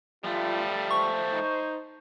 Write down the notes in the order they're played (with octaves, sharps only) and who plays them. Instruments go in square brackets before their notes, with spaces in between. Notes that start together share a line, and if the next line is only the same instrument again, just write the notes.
[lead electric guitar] F3 A3 [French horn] G3 [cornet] F4
[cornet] C5 [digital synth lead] C#6
[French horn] D#4